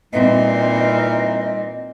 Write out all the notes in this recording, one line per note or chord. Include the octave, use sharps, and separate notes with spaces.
A#2 E3 G3 C4 D#4 D#5